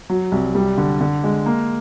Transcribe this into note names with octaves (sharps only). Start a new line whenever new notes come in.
F#3
C2
G3
D3
D3
G#3
A#3